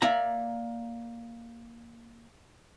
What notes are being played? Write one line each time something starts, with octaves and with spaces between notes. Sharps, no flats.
A#3 D5 E5 A#5